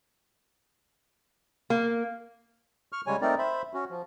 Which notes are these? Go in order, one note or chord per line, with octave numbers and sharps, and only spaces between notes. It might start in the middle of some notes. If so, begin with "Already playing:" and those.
A#3
C#6 F6
C#3 G3 G#3 C#5 G#5
A3 C4 D#4 A#4 D5
C5 E5 B5
C#4 F#4
F3